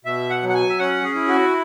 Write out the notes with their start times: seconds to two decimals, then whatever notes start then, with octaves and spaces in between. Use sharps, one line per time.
0.05 B2 E5
0.30 F#5
0.42 F#3
0.49 F#5
0.54 G#5
0.69 E5
0.79 C#4 F#5
1.04 G#4
1.15 E4
1.28 F#4